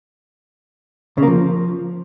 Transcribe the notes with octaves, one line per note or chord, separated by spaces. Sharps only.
C#3
A#3
F3